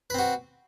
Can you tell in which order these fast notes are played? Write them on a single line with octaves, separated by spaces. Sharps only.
B4 C4 F#4